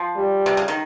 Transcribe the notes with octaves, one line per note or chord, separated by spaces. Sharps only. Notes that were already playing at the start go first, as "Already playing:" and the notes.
Already playing: F3
G3
C3
C#3
D#3